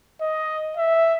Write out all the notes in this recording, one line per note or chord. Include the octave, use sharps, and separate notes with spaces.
D#5
E5